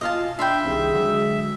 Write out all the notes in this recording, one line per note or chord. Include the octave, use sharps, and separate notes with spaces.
B2 F4 D#5 F5 G#5 A5
D4 E5 G5 B5 C6
C2 C3 D#3 G#4
D3 F#3 G#3